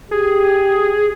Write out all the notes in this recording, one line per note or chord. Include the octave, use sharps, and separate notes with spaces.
G4 G#4